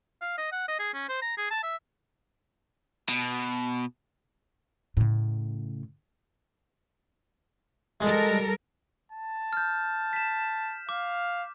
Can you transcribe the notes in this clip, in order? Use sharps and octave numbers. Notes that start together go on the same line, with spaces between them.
F5
D#5
F#5
D#5
G#4
C#4
C5
A#5
G#4
A5
E5
B2
A2 C#3
G3 G#3 A4 A#4
A5
F6 G6
B6 E7
F5 D6